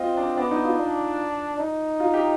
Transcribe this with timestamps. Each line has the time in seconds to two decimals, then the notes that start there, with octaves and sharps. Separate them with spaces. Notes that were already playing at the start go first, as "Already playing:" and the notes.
Already playing: C4 F4 D#5
0.17 D4
0.37 B3 D4
0.51 D#4
0.64 F4
0.78 D4
1.59 D#4
2.00 F4
2.14 G4